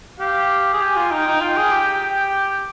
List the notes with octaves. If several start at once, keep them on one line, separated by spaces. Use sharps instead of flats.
G4 F5
G#4
G4 G#5
F4
D#4 G5
D#4
F4 G5
G#4
G4
G5